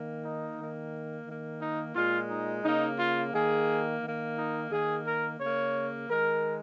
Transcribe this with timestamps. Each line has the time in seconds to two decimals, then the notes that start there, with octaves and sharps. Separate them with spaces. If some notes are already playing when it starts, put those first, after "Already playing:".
Already playing: D#3 A#3
0.24 D#4
0.58 D#3 A#3
1.27 D#3 A#3
1.61 D#4
1.96 A#2 G#3 F4
2.30 D#4
2.64 C#3 A#3 D#4
2.99 F4
3.34 D#3 A#3 G#4
4.02 D#3 A#3
4.37 D#4
4.71 D#3 A#3 G#4
5.06 A#4
5.40 C#3 A#3 C#5
6.09 D#3 G#3 A#4